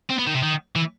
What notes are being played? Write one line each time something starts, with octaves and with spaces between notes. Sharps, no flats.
C4
B3
D#3
C3
D#3
E3